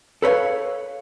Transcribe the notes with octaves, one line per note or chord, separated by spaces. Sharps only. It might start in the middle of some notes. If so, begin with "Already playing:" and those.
A4 B4 C#5 F5